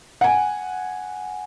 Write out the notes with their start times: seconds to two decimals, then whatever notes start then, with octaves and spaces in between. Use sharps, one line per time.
0.21 F#5 G#5